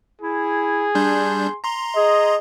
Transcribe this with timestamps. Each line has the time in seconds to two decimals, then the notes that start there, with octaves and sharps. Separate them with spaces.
0.22 E4 G#4
0.95 G3 D4 C6 G6
1.64 A#5 C6
1.96 G#4 D#5